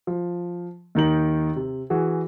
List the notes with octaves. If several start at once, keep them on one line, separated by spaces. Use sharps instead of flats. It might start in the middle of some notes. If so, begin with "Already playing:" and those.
F3
D#2 D#3 D#4 F#7
C3
E3 F#4 G#4